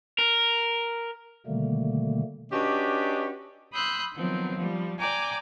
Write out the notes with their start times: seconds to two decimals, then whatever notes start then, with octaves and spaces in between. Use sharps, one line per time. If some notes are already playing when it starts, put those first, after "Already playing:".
0.19 A#4
1.47 B2 D3 D#3 G3 A3 A#3
2.52 C#4 D4 F#4 G4 B4 D#5
3.73 B5 C6 D#6 E6 F#6 G6
4.14 D#3 F3 F#3 B3 C4
4.56 F3 G3
4.99 D5 G5 G#5 A#5 D6